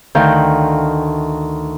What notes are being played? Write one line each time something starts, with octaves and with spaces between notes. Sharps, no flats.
D2 D#3 D4 F5 G5